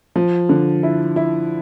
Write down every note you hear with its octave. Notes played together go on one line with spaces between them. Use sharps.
F3
D3
E4
E4